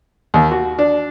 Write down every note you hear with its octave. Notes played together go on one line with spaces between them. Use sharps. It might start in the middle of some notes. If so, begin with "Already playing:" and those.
D#2
F#4
D4